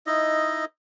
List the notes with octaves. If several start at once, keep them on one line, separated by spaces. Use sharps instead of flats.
D#4 E4 D#5